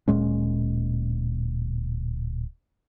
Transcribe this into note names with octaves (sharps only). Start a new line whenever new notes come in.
D1 A#2 G#3 C#4